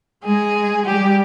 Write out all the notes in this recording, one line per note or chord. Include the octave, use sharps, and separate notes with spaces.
G#3 G#4
G3 G4